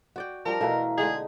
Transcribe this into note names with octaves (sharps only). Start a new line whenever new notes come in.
F#4 D5 G5
F3 G3 D4 A#4
B2 E3 A3 E4 F5 A#5
D3 G#3 D#4 G#4